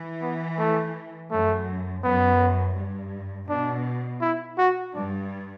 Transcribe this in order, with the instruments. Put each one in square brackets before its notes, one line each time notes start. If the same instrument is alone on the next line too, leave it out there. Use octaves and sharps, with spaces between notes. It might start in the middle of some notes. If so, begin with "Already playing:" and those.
Already playing: [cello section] E3
[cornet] B3
A3
[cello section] F#2 [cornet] A3
[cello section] F#2 [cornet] B3
[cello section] G2
[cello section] B2 [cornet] D4
[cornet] E4
F#4
[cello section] G2 [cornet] D4